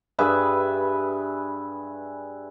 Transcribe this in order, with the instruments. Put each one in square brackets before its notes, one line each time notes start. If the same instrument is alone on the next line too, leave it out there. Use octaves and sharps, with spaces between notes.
[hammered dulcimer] G2 G#4 B4 E5